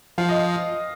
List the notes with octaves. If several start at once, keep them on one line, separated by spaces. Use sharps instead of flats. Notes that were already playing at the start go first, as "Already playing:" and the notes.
F3 F5
D#5